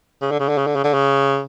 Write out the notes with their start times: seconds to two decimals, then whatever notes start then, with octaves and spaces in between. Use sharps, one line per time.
0.21 C#3
0.31 D3
0.40 C#3
0.49 D3
0.58 C#3
0.66 D3
0.75 C#3
0.84 D3
0.94 C#3